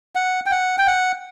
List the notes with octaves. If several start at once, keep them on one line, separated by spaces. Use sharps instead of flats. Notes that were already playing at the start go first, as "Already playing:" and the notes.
F#5
G5
F#5
G5
F#5